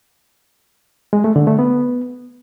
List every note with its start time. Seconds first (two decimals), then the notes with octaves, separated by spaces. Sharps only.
1.13 G#3
1.24 A3
1.36 D3
1.47 A3
1.59 B3